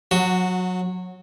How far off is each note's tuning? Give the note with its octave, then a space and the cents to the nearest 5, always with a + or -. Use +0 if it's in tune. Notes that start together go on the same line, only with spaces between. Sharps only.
F#3 -20 F#4 +0